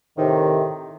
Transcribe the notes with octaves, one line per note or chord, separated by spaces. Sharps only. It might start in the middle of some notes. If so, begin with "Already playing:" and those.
A2 C3 D#3